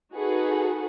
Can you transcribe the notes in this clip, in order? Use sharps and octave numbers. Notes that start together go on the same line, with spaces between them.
D#4 F#4 G#4 A4 B4 F#5